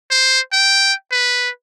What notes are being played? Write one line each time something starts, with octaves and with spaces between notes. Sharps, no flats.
C5
G5
B4